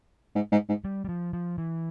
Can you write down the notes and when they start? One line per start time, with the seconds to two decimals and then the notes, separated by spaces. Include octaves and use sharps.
0.35 G#2
0.52 G#2
0.69 G#2
0.85 G3
1.05 G3
1.09 F3
1.33 F3
1.58 E3